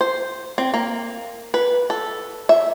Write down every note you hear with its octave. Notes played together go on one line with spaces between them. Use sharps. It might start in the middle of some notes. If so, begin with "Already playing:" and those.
C5
C4
A#3
B4
A4
E5